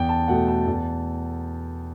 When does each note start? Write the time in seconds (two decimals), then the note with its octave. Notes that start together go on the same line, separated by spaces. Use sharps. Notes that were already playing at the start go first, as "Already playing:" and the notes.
Already playing: E2 G5
0.09 A5
0.28 B2 A3 F#5
0.48 A5
0.67 E2